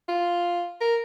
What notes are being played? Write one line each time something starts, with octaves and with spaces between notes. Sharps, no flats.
F4
A#4